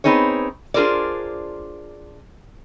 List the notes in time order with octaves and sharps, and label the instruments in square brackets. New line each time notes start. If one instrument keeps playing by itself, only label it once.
[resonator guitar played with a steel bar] B3 C4 D#4 G#4 C#5
D4 F4 G#4 A#4 C5 D5